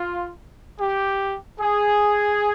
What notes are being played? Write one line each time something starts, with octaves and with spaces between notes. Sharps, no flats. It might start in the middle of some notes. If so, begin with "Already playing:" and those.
Already playing: F4
G4
G#4